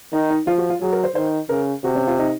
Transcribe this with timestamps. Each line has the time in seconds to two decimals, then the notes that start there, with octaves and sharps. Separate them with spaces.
0.13 D#3 D#4
0.30 D#4
0.47 F3 F4
0.58 F#4
0.70 F4
0.81 F#3 G#4
0.92 A#4
1.04 C5
1.15 D#3 C5
1.49 C#3 A#4
1.84 C3 F#4
1.95 C#4
2.07 F4
2.19 D#4